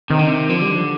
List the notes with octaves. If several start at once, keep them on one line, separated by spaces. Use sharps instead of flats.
C3 D#3
D3
C3
D3 F3
G3
F3